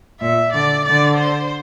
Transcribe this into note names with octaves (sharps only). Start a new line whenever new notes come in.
A#2 E5
D3 D5
D3 D5
C5